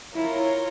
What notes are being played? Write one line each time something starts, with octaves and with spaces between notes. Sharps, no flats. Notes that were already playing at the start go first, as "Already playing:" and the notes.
E4 F4 A#4 C#5